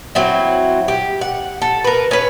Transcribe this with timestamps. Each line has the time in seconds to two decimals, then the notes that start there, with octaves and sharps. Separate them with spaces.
0.15 F#3 C4 E4
0.88 G4
1.21 F#5
1.62 A4
1.84 A#4 B4
2.11 C#4 B4